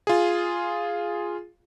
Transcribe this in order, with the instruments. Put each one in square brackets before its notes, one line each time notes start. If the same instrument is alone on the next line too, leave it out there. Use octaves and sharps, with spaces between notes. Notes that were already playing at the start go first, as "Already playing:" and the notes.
[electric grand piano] F4 G#4